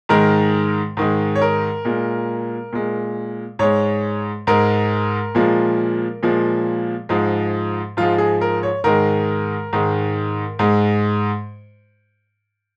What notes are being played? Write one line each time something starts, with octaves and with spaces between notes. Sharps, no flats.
G#2 D#3 G#3 A#4
G#2 D#3 G#3
C#5
A#4
A#2 G#3
A#2 G#3
G#2 G#3 C#5
G#2 G#3 A#4
A#2 F3 G#3
A#2 F3 G#3
G#2 F3 G#3
G#2 F3 G#3 F4
G#4
A#4
C#5
G#2 D#3 G#3 A#4
G#2 D#3 G#3
G#2 G#3